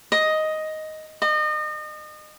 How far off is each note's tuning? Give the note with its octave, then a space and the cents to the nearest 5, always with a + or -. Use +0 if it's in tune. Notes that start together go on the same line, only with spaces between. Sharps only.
D#5 +5
D#5 -35